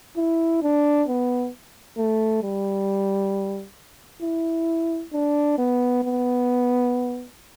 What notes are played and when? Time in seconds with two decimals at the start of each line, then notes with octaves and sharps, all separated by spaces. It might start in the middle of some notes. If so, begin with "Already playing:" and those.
0.17 E4
0.62 D4
1.08 B3
1.97 A3
2.43 G3
4.22 E4
5.13 D4
5.58 B3
6.04 B3